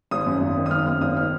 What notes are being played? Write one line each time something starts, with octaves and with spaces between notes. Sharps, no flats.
G#1 D#6
F#2
G#1
D#3
D#6
G#1 F6
F#2 F6
G#1 D#6
D#3 F6